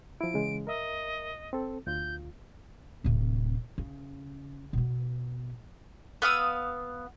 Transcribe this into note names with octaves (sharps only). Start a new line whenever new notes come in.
F3 E4 D7
C#3 E3 G#3
A#4 D#5 E5
C4 A4
D2 F4 G6
D1 C3
C#3
B2 B3
B3 F5 D#6 E6